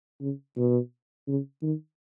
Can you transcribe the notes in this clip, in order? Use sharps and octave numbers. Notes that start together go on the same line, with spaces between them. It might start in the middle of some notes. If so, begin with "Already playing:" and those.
C#3
B2
C#3
D#3